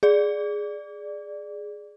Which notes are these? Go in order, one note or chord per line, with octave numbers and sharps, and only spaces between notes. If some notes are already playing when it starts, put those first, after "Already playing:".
G#4 D5